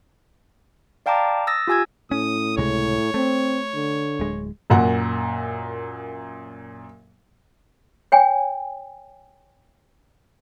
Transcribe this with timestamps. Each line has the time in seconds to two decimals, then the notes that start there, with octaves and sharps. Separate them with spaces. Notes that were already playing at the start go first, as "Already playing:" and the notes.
1.06 D5 F5 G5 A5 A#5 D6
1.47 D#6 E6 A6 A#6
1.67 F4 G4 G#5 E6 G#6
2.11 A2 C#4 D#6
2.57 C#2 C3 G#3 C#5
3.14 A3 C4
3.75 D3
4.20 D1 G#3
4.70 F#2 A#2 F#5
8.12 C#5 G5 G#5